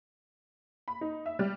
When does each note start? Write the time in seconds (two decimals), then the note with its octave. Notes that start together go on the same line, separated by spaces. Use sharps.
0.88 B5
1.01 D#4
1.26 E5
1.39 G3